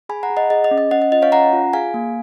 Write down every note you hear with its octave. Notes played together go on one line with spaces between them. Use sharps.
G#4 G#5 B5
F#5 A#5
G#4
D#5 F#5
G#4 D#5
D#5
C#4
D#5
C#4 D#5 F#5
D#5
F4 D#5
C#5 F5
C#4 F#5 A#5
F4
G#4 F5 G#5
A#3